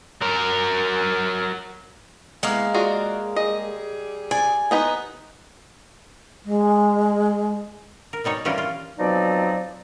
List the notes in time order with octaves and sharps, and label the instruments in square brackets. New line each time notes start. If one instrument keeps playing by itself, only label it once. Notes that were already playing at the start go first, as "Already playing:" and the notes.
[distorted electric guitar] F#3 A#4
[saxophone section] E3 B3 [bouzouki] G#3 A#3 F5
[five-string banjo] F4 F#4 G#4 [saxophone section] D5
[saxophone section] G3 G4 G#4 [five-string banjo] D#5
[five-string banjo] D5 [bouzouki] G#5
[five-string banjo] B3 D#4 B4 [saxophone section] G4 C5 D#5
[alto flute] G#3
[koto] A#4
B2 G3 D#4 C#5
E3 G3 C#4 F4 G4 A#4
F4
[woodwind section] B2 F3 F#3 C4 D#4 D5